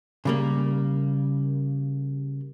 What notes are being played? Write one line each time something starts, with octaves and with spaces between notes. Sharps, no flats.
C#3 G3 A#3